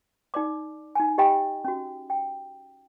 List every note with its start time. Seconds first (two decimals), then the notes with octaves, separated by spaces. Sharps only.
0.34 D#4 D5 D6
0.95 D#4 G#5
1.18 G4 D#5 G5 B5
1.65 C#4 F#4
2.10 G5